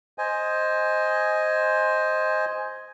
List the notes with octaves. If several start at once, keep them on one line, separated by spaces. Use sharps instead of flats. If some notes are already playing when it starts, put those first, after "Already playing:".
C5 D#5 G#5